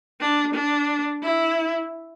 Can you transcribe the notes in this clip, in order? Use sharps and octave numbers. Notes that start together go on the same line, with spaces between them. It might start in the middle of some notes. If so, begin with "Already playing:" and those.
D4
D4
E4